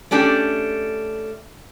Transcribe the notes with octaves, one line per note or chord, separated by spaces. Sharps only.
A3 C#4 D4 G4